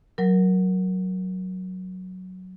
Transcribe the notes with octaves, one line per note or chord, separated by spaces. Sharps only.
F#3 A#4